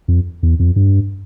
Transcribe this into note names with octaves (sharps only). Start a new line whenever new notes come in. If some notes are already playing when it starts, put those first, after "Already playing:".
F2
E2
F2
G2